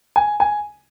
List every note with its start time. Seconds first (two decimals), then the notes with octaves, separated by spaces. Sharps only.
0.16 G#5
0.40 G#5